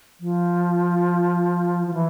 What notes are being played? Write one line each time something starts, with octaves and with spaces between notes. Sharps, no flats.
F3
F3
E3